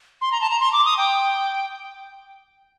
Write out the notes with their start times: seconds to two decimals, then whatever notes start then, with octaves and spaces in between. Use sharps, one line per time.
0.21 C6
0.32 A#5
0.41 A5
0.50 A#5
0.60 C6
0.73 D6
0.85 D#6
0.97 G5